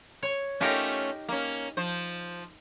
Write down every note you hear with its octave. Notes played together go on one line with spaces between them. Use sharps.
C#5
A3 C#4 D#4 F4 G4 A#4
A#3 C#4
F3 C5